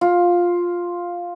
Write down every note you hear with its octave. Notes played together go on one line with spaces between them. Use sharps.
F4